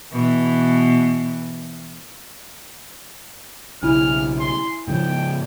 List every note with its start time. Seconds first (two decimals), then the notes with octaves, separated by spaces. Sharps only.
0.12 B2 E3
3.82 B1 C#3 E4 G#5 F6
4.40 C6
4.87 G#2 C#3 F3 G5